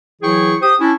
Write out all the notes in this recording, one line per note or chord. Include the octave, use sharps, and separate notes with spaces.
E3 F#3 E4 G#4 G5 C#6
G4 C5 D#6
C#4 D4 E4